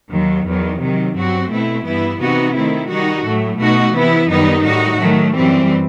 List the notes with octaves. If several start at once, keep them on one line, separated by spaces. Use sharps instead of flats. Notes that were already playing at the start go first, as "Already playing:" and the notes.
D#2 D#3 F#3
E2 D#3 F#3
C3 D#3 F#3
G2 F#3 C4 F#4
B2 A3 C4 E4
G2 E3 B3 E4
C3 E3 B3 D#4 F#4
D#3 A3 C4 E4
D#3 G3 D#4 F#4
A2 F#3 A3
B2 A3 D#4 F#4
C3 E3 B3 E4
F#2 D#3 G3 B3 D#4
A2 G3 D#4 F#4
D#3 F#3 A3
F#2 E3 G3 C4